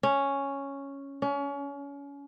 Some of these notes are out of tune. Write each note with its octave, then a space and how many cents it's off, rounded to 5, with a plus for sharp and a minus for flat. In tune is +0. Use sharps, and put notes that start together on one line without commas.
C#4 +0
C#4 +30